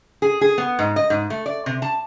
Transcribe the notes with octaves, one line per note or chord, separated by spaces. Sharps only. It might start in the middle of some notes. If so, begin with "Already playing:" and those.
G#4
G#4
B3
G#2
D#5
G#2
A3
D5
C3
A5